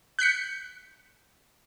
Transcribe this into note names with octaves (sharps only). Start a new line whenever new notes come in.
F#6 G6 B6 C#7